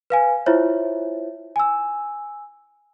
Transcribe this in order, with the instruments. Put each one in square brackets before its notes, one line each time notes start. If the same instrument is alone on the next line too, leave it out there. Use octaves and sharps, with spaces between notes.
[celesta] B4 F5 G#5
E4 F4 C5 C#5 E5
G#5 E6